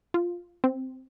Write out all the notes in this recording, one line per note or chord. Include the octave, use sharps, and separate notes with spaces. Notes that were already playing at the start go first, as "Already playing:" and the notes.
F4
C4